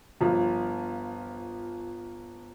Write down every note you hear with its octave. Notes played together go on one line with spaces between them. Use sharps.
G1 F3